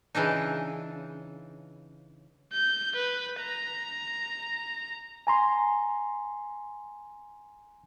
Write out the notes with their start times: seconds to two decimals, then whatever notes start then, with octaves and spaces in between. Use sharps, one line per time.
0.15 C#3 E3 D4 D#4
2.52 G6
2.96 B4
3.40 A#5
5.27 G#5 A#5 C6